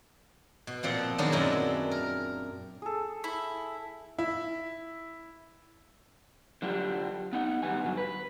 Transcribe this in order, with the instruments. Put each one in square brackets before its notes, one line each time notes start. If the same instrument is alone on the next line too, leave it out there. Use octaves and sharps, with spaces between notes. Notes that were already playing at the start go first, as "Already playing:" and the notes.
[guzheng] B2
A#2 F3 C4 F#5
D#3 F#3 G#3 B3 D4 D#4
F#2 A#2 G#3 C4 E4
A#4
[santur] G#4 A4
[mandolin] E4
[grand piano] E4
[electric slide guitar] D3 F#3 D4 F4 G4
B3 D#4 F#5
F#2 D#3 G3 B3 G#5
G2 D3 F#3
B4